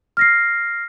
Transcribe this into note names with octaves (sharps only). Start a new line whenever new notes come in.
F6 A#6 C7